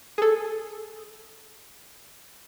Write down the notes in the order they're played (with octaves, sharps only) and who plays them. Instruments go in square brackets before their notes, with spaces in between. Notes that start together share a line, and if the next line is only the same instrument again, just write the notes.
[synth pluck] G#4 A4